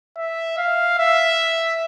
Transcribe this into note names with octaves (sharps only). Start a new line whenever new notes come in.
E5
F5
E5